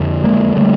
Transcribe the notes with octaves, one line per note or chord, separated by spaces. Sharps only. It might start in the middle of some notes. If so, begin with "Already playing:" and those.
Already playing: F2 D3
G#3 A#3
D3 G3 A3